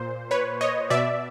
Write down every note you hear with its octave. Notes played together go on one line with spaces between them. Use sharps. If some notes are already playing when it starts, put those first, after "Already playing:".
Already playing: A#2 C5
B4 C#5
C#5 D#5
B2 D5 E5